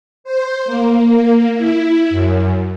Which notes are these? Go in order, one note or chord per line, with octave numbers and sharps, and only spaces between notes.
C5
A#3
E4
F#2